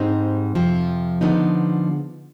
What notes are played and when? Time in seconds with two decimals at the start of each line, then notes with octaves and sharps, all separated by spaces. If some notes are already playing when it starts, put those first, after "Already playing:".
Already playing: G#2 G3 C4 D#4
0.55 F2 C3 F3
1.21 D3 F3 G#3 B3 D#4